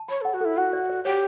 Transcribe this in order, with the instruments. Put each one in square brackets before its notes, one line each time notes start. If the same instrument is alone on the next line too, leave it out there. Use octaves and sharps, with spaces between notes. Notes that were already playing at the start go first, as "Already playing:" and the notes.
Already playing: [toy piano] A5
[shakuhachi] C#5 [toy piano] B5
[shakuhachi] A4 [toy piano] F#5
[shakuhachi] F#4
[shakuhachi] E4 [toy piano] A4
[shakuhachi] F#4 [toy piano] F#5
[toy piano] D5
D5
[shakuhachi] G4 [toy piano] C#5